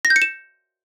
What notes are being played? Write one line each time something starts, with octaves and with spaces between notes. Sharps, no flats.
A#6
G6
C#7
E7